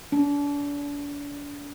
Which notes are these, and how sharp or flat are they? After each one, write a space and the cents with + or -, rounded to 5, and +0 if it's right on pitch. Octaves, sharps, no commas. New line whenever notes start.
D4 -35